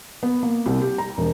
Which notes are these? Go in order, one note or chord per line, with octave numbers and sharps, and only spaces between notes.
B3
A#3
C2
G4
A#5
E1